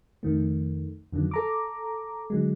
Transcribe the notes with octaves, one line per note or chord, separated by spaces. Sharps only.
F2 D#3 A3
F2 D3 D#3 F#3
A4 A#5 D6
D3 F#3 G#3